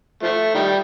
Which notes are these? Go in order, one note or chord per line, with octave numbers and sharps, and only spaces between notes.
F3 A3
D#3 G3